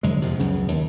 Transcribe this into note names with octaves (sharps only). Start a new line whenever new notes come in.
F#1 F2 D3 G#3
E2 C3 F3
C#2 F#2 C#3
D#2